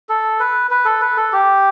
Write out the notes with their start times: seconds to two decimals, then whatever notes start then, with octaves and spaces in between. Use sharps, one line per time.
0.09 A4
0.39 B4
0.71 B4
0.85 A4
1.01 B4
1.17 A4
1.33 G4